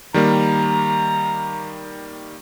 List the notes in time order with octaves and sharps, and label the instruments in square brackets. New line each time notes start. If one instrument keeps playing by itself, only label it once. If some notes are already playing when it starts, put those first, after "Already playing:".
[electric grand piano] D#3 G3 A#3 [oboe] A#5